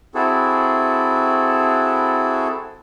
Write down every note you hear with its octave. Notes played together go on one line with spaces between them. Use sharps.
C4 E4 F#4 G#4 A4